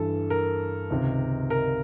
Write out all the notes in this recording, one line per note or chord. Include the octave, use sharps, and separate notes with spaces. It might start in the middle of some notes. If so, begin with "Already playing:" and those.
Already playing: G2 E3 A4
A#4
C#2 C3 D#3
A#4